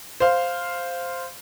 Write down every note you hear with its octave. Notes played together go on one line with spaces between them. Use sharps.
C5 F5